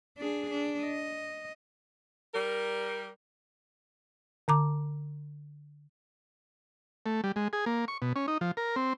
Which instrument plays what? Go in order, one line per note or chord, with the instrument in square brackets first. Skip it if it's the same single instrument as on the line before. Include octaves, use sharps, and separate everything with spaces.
[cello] D4 G#4
D4
D#5
[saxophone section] G3 A#4
[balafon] D3 A#5 D6
[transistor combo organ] A3
G3
G#3
G#4
A#3
C#6
B2
C#4
D#4
F3
A#4
C4